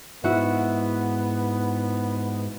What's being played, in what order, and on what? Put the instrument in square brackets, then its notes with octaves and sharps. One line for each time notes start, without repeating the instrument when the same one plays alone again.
[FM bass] G#2 [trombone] B3 [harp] E4 F#4 E5